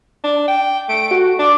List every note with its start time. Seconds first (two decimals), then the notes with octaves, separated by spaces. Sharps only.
0.24 D4
0.48 G5
0.89 A3 D7
1.11 F#4
1.39 D4 D6